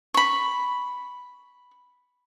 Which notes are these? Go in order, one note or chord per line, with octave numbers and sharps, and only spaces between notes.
B5 C#6